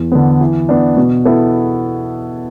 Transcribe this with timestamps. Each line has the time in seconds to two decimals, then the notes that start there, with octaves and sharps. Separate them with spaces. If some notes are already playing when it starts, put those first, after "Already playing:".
Already playing: E2
0.12 D3 B3
0.41 E3
0.69 B3 D4
0.97 B2
1.25 B3 E4 A4